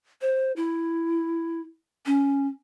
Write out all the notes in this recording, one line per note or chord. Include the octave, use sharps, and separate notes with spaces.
C5
E4
C#4